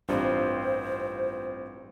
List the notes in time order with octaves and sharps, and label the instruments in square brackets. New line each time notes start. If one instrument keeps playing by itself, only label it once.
[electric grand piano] A1 C4 F4 [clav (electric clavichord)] G2 [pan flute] C5